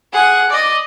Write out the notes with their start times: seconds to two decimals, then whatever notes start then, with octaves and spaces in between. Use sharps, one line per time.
0.12 G#4 F#5
0.50 D5 D#5